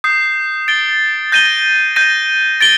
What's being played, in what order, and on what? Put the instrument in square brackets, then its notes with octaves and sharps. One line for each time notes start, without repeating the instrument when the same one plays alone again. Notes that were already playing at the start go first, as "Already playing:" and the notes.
[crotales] D#6 G6 C7
A6 D7 G7
G6 A#6 D#7 G7
G6 A#6 D#7
A6 D7 G7